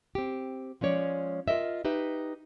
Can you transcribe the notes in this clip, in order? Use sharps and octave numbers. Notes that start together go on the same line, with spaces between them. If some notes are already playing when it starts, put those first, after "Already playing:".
C4 G4
F3 G#3 C#4 C#5 D5
F4 F#4 A#4 D#5 E5
D#4 G4 B4 E5